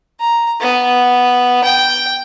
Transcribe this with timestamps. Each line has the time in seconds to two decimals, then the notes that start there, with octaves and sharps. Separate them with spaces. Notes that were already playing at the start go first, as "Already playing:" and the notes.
0.21 A#5
0.61 B3
1.64 G5